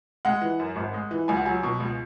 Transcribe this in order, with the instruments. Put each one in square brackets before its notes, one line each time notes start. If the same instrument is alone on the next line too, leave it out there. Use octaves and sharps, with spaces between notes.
[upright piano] G#3 F#5
E3
F#2
G#1
G#3
E3
C#2 G#5
F#5
F#3 G#5
B2
C#2